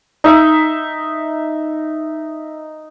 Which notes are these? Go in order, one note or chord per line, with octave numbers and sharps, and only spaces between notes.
D#4 E5